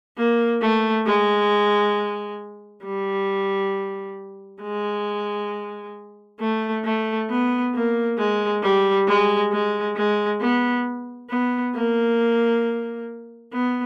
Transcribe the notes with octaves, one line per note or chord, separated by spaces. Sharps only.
A#3
A3
G#3
G3
G#3
A3
A3
B3
A#3
G#3
G3
G#3
G#3
G#3
B3
B3
A#3
B3